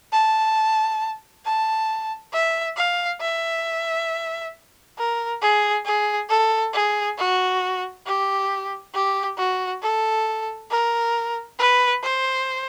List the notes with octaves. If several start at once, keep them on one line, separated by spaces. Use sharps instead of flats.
A5
A5
E5
F5
E5
A#4
G#4
G#4
A4
G#4
F#4
G4
G4
F#4
A4
A#4
B4
C5